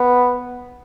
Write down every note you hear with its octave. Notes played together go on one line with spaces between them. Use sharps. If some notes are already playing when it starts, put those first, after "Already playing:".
Already playing: B3